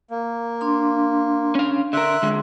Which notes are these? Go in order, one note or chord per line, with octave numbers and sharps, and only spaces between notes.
A#3
D4 C6
C#4 F5
D3 A#4 E5 C6 F#6
D3 G#3